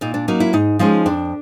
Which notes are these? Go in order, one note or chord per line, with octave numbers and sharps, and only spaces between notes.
A#2 D#4
D4
F#3 A#3 C#4 D#4
E4
G#2 D#4
F3 G#3 C#4 D#4
F2 D4